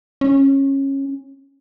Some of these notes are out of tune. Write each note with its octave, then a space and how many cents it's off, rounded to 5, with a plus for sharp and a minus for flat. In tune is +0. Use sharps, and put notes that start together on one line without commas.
C#4 -20